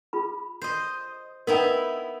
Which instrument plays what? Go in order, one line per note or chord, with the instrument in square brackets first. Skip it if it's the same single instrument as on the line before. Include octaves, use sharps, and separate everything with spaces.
[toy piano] F4 G#4 B5
[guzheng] C5 D#5
[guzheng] B3 D#4 E4 [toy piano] A#4 G5